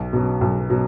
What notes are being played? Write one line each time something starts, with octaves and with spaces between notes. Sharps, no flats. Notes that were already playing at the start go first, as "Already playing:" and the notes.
Already playing: B1
B2 F#3
B1
B2 F#3